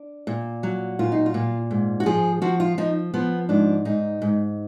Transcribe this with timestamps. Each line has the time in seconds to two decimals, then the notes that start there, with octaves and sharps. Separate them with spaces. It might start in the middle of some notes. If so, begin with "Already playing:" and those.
Already playing: D4
0.27 A#2
0.63 F#3
0.99 A#2 F4
1.12 D#4
1.26 F4
1.34 A#2
1.71 G#2
2.00 F#4
2.06 F3 G#4
2.42 F3 F#4
2.60 F4
2.78 F3 D#4
3.14 F3 B3
3.49 G#2 D4
3.85 G#2 D#4
4.22 G#2